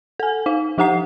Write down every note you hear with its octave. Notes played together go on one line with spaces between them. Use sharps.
A4 G#5
D#4 F5
F3 D#4 G4 F#5 A#5 C7